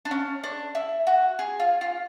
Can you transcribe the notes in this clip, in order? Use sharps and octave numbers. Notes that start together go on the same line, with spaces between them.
D4
C#4
D4
E4
F#4
G#4
F4
F4